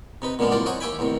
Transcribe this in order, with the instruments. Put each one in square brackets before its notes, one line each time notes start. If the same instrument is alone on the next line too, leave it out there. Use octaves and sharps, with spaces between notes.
[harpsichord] C3 D#4 B4
A#2 D3 G#3 A#3 B3 D4
C2 F#2 D3 F4 D5
C5 C#5 D#5 F#5 G#5 A#5
D#2 G4 E5 G5 G#5 B5
A1 E2 C3 D#3